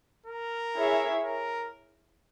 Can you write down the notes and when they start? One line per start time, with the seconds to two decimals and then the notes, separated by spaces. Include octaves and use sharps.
0.26 A#4
0.76 E4 G#4 C#5 E5
1.24 A#4